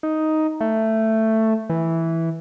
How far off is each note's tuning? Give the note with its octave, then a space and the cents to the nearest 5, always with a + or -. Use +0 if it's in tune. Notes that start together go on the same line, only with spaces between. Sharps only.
D#4 +5
A3 +10
E3 -5